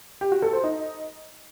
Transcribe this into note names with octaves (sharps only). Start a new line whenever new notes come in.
G4
F#4
A4
C5
D#4